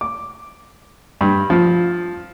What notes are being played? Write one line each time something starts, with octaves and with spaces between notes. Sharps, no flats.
D6
G2
F3